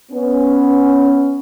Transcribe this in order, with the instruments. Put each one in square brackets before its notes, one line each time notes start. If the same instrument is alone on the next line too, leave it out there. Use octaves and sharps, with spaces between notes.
[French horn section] B3 C#4